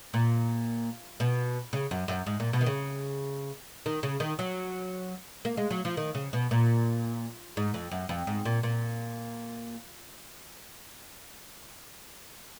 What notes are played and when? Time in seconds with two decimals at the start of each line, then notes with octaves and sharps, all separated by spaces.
0.14 A#2
1.20 B2
1.73 C#3
1.91 F#2
2.08 F#2
2.26 G#2
2.40 A#2
2.53 B2
2.61 D#3
2.66 C#3
3.86 D#3
4.03 C#3
4.20 D#3
4.39 F#3
5.45 A#3
5.57 G#3
5.71 F#3
5.85 F3
5.97 D#3
6.15 C#3
6.33 B2
6.51 A#2
7.57 G#2
7.74 F2
7.91 F#2
8.09 F2
8.27 G#2
8.45 A#2
8.63 A#2